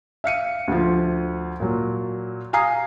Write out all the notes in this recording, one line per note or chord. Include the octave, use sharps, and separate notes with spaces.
E5 F5 C#7 D#7
D2 F3
A#2 F#3
F5 G#5 A#5 D#6 C7